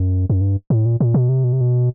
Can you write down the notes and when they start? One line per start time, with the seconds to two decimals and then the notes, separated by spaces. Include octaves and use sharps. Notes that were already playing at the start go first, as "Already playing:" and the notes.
Already playing: F#2
0.30 F#2
0.41 G2
0.70 A2
0.85 A#2
1.00 A#2
1.14 B2
1.29 C3
1.44 B2
1.53 C3
1.61 B2